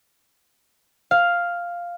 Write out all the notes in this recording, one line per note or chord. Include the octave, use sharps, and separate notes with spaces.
F5